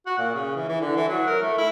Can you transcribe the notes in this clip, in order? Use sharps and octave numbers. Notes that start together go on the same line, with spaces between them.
F#4
A#2
C#3
E3
E3
D3
E3
F#3
A#4
A3
E4